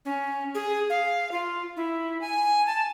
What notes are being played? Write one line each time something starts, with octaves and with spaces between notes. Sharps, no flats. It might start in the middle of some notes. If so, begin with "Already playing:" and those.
C#4
G#4
F5
F4
E4
G#5
A5